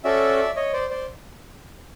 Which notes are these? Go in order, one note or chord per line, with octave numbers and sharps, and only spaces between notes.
C#4 F#4 A4 D5 E5
C#5 D#5
C5 D5
C5 D5